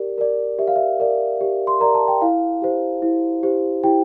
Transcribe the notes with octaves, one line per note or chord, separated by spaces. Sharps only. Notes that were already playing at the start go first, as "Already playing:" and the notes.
Already playing: G4 A#4 D5
A#4 D5
G4 E5
F5
E5
A#4 D5
G4
C6
A#4 D5 A#5
A5
G5
E4 F5
G4 C5
E4
G4 C5
E4 G4 G5